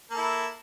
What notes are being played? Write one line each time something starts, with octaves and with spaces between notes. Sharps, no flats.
A#3 E4 A4